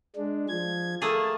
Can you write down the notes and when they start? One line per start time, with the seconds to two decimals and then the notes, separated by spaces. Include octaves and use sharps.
0.16 G#3 D4
0.49 F3 G#6
1.02 A3 A#3 G#4 A5